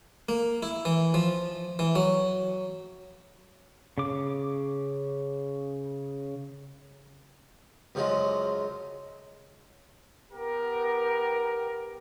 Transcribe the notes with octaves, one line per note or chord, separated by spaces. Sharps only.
A#3
E4
E3
F3
E3
F#3
C#3 D6
F#2 C#3 F3 F#3 G#3
B3 G4 A#4